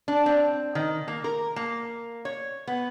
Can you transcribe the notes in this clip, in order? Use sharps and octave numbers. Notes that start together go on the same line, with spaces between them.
D4
C4
D#3
A#3
A#4
A#3
C#5
B3